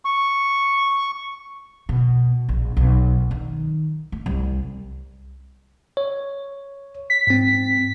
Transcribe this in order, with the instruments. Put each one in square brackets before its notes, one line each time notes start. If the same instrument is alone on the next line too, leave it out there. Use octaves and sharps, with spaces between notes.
[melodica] C#6
[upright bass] B2
A#1
B1
D#3
A3
C2
[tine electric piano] C#5
[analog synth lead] B6
[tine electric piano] G#2 C4